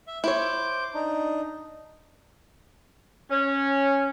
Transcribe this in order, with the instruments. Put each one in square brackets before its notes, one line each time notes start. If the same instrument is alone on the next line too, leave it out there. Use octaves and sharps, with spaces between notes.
[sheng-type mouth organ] E5
[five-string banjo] E4 C#5 [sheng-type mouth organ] C5 D6
[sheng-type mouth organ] D4 D#4
[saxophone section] C#4